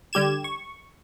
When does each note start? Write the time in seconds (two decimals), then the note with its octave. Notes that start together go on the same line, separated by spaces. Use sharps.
0.13 D3 G3 G4 G#6 E7
0.44 C#6